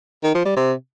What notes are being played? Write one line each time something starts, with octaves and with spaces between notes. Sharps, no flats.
D#3
F3
G3
C3